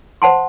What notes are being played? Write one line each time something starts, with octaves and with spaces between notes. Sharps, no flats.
C5 F#5 A5 C6